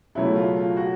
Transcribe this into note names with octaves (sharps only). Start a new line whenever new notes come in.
C#2 B2 F#3 A3 E4
F4
F4
F#4